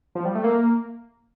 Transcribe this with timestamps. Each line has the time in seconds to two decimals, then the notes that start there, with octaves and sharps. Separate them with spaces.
0.15 F3
0.25 G3
0.35 A3
0.44 A#3